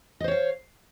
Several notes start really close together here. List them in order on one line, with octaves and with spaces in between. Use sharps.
D#5 C5 C#5 F5